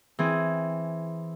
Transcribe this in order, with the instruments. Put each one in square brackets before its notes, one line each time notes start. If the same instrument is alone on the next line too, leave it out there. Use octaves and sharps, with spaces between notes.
[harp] E3 C4 G#4